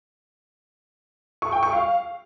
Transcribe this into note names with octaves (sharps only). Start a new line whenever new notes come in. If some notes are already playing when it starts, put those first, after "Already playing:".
C#6
G5
C#6
F5